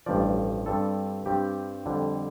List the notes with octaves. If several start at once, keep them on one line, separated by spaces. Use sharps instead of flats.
A1 G2 F3 D5
G2 G3 C4 A4
G2 G3 C4 G4
F2 D3 G3